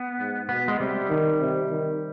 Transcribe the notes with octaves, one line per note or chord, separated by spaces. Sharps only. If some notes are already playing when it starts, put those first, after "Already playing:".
Already playing: B3
G#2
B2 B3
G#3
C3 G3
D#3
C3
D#3